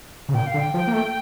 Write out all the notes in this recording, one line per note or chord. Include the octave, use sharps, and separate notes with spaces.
C#3
A#2 G5
F5
D3
G5
F3
A#3
A3